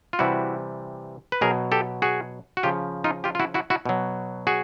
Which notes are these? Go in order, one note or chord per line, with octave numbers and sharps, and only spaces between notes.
F4
C3 E3 G3 E4 F#4
B4
B2 F#3 G#4 A#4
G4 A4
F#4 G#4
F#4
C#3 F3 F4 G4
D#4 F4
F4 G4
F4
E4 F#4
E4 F#4
E4 F#4
B2 F#3
F#4 G#4